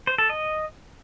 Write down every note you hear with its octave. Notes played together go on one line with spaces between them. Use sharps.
C5
A4
D#5